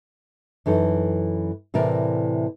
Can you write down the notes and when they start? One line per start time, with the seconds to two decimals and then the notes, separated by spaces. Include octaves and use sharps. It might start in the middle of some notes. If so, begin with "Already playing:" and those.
0.66 F#2 E3 D#4 A4
1.74 A2 C3 E3 A#4 D5